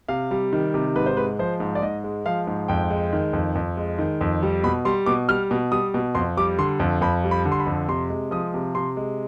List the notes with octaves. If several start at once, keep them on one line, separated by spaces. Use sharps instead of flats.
C3 F5
G3
D#3
C3
G#2 B4
C5
G#3 B4
F3 C5
G#2
D5
G#2 D#5
G#3
F3 F5
G#2
F2 G5
G#3
D#3
F2
F2
G#3
D#3
F2
G3
B2 B5
G3 C6
B2 D6
G3 F6
B2
G3 D#6
B2
F2 C6
G3 D6
D3 C6
F2
F2 B5
G3
B5
D3
C6
B5
F2
C3 C6
G#3
F3 D#6
C3
C3 C6
G#3